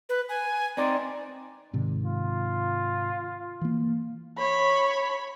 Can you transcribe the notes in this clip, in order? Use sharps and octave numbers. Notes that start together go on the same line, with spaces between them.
B4
G#5
C4 D#4 C5 D5
G#2 C3 D#3
F4
E3 A#3
C#5 B5